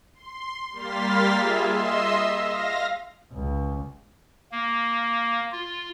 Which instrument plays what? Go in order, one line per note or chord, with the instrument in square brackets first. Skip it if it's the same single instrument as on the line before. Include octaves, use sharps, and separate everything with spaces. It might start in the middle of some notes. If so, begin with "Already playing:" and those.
[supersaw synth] C6
G3 A#3 C6 F6 A6 B6
F4 G#4 E5
D#5 E5 C6 E6
F5 A#6
[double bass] C#2
[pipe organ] A#3
F4